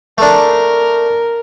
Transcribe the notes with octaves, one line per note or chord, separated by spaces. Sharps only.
A3 D4 A#4